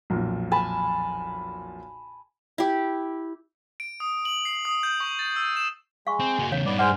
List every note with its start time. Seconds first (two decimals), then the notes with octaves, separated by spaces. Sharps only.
0.10 B1 F2 A#2
0.51 G#5 A5 B5
2.58 E4 G4
3.80 D7
4.00 D#6
4.25 F#7
4.45 C7
4.65 D#6
4.83 G6
5.00 C#6
5.19 A6
5.36 E6
5.57 E7
6.07 G#3 F5 C#6
6.20 C4
6.39 A#3 F#4
6.52 E2 C#3 C#5 F5
6.66 G2 B3 D#4 D5
6.79 G#3 C5 D5 F#5 F6